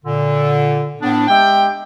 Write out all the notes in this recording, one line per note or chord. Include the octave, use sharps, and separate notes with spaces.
A#2 D3
A2 B3 D4
G#3 G4 E5 G5